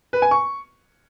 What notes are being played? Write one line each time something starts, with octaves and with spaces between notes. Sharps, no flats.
B4
G#5
C#6